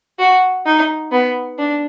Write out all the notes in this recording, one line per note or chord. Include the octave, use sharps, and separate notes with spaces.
F#4
D#4
B3
D4